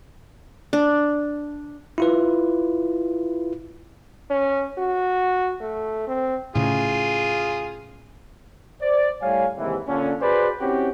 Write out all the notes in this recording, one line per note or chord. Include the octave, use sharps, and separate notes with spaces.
D4
E4 F4 B4
C#4
F#4
A3
C4
A2 C#3 F4 G#4
C5 D5
A2 G3 C#5 F5 G#5
D#2 G#2 C3 E3
A#2 D3 C#4
F#4 G#4 B4 C5 D5 G#5
C4 C#4 E4 F#4 G4